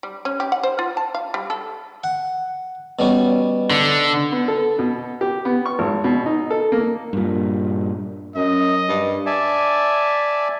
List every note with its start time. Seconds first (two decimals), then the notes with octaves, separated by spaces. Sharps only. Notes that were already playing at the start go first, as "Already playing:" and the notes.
0.03 G3
0.25 C#4
0.40 G4
0.52 F#5
0.63 C5
0.79 F4
0.97 A5
1.15 F5
1.34 G3
1.50 A4
2.04 F#5
2.99 B2 G3 C#4
3.70 D3
4.32 B3
4.48 A4
4.79 B2
5.21 G4
5.45 B3
5.66 C#6
5.79 G#1
6.04 B2
6.26 D#4
6.51 A4
6.72 A#3
7.13 G2 A#2
8.36 F#2 D#5
8.88 G2
9.26 D5 E5 G#5 A5